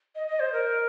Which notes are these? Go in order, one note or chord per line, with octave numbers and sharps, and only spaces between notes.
D#5
D#5
C5
A#4